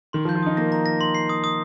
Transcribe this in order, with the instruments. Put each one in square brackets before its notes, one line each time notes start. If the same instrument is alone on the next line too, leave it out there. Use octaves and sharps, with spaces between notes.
[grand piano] D#3 [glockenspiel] C6
[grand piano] F3
[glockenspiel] G6
[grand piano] F4
[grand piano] D#4 [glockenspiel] D#6
[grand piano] A#3 [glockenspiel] A#6
[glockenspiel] A#5
A#6
C6
C7
D#6
D#6